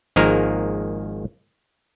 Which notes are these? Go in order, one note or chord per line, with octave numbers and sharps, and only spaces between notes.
G#1 D#3 F3 G#3 A#3 A#4